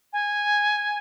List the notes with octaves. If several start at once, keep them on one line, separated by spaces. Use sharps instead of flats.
G#5